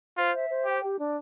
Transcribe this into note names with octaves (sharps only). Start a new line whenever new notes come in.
F4 C5
E5
C5
G4 G5
G4
D4